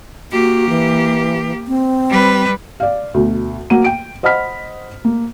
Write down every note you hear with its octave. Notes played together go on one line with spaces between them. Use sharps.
A#3 F#4 G4
E3
C4
G3 B4
D5 F5
D2 B2
F#3 A#3 F#5 D#7
G5 D7
C5 D#5 F#5 B5 F6 B6
A#3